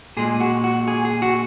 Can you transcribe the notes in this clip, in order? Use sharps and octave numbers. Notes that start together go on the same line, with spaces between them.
A#2 G#3 G#4
F#4
F#4
G#4
G#4
F#4